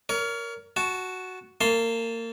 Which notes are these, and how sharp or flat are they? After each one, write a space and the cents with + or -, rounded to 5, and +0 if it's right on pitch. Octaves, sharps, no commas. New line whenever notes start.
A#4 +0 C#5 +35
F#4 +0 A5 -15
A#3 -30 A5 +0 C6 +0